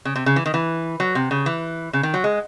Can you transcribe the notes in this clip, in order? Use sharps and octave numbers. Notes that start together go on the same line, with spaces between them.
C#3
C3
C#3
E3
D#3
E3
F#3
C3
C#3
E3
C#3
D#3
F#3
G#3